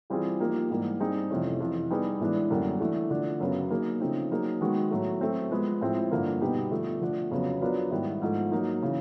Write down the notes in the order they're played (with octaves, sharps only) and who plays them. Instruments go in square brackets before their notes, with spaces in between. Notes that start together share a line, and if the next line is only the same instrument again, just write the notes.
[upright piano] E3 G3 C4 F4 G#4
F3 A#3 D#4 G4
G#2 E3 G3 A#3
G3 C4 D#4 G#4
F2 C3 E3 A3 C#4
F2 C3 E3
G3 B3 D#4 G#4 B4
A2 E3 G#3 B3 D4
F#2 D3 G3 A#3
E3 A3 D4
D3 F3 A3 D4
F#2 C#3 F#3 B3
F#3 A#3 D#4 G#4
C#3 F3 A3 C4 D#4
F#3 A#3 D#4 G#4
D#3 G#3 B3 D#4 F#4
A2 F#3 A3
F#3 A3 C4
F3 G#3 B3
A2 F3 G#3 C4 E4
G2 D3 F3 A#3
B2 G3 B3 D#4 G4
D3 F3 A3
D3 F3 A3 D4
F2 C#3 F#3 B3
F#3 B3 D4 F4 A#4
G#2 D#3 G3 B3 E4
G#2 F3 A3
F#3 A#3 D#4
C#3 E3